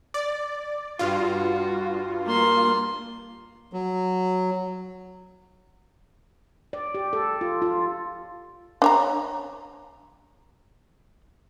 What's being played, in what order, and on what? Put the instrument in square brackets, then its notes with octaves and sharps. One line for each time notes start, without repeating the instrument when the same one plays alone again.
[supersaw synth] D5
[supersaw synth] G2 F4 [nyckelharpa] F#4
[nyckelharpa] A#3 C6
[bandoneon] F#3
[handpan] D5
G4
A4
F4
F4
[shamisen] D4 C#5 A#5